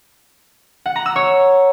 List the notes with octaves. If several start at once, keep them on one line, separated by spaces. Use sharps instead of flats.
F#5
A#5
E6
C#5